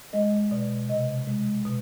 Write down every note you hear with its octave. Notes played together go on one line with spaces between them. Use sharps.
G#3 D#5
B2 D5
C3 D#5
G#3
B2